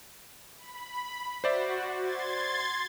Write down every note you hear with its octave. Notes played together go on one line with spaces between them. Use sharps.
B5
F#4 C5 D5 E5
C6 G#6 A6